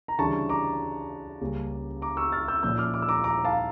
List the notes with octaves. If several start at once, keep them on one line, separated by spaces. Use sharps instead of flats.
A#5
D2 C#3 E3 G3 D4 A5 C#6
A#5 D6
C#2 C#3 G3 A#3 C#4
A#5 D6
C#6 E6
F6 A6
E6 G6
A#2 F3 A#3 C#4 E6 G6
D6 F6
D6 F6
E6
A#5 D6
A#5 D6
F5 A5